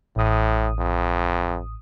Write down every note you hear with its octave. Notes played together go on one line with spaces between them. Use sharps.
A1 A2 D#6
F2